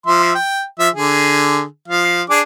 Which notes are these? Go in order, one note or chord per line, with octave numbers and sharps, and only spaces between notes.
F3 E5 C6
G5
F3 E5
D3 G#4
F3 F5
D4 G#4 D6